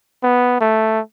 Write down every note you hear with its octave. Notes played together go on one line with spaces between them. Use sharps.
B3
A3